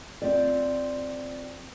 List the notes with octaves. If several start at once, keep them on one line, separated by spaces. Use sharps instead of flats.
C4 F4 D5